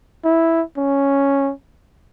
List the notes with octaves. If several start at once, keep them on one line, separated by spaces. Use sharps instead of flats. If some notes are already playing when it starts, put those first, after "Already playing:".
E4
C#4